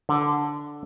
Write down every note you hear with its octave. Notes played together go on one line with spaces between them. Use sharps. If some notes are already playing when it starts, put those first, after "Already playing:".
D3